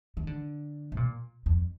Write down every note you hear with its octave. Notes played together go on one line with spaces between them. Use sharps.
D#3
D3
C3
A#2
F2